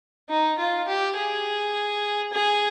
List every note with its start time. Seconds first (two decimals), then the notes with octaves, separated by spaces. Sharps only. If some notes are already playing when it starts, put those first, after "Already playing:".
0.29 D#4
0.59 F4
0.88 G4
1.17 G#4
2.33 G#4